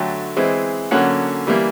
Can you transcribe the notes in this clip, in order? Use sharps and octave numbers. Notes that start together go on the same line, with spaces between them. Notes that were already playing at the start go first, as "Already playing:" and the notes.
Already playing: D3 F#3 A3 G5
E3 G#3 C4
D3 F#3 A#3 C#4 F#5
E3 G3 A#3